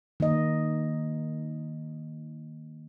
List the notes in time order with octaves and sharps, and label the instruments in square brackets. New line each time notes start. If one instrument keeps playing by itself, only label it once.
[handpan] D#3 A#3 D#5